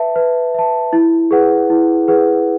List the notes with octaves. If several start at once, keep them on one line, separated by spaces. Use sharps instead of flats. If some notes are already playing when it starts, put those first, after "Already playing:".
Already playing: B4 E5 A5
B4
E5 A5
E4
G#4 B4 F#5
E4
G#4 B4 F#5